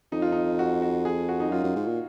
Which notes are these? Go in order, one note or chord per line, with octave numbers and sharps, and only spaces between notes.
F2 D#4
F4
D#4
F#4
F#4
G#4
F#4
D#4
F#2 F4
F#2
G#2
A#2